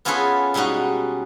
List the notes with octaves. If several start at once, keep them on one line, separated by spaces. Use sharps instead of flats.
B3 C#4 F4 G#4 A4 B4
B2 G3 G#3 D#4 F#4